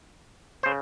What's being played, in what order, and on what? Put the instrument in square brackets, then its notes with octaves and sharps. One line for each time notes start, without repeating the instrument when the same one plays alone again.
[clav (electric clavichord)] C#3 C5